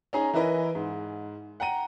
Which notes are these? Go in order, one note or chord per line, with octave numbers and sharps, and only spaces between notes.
C#4 D#4 G#4 A#5
E3 E4 A#4 B4 D#5
G#2
F#5 G5 A#5 D#7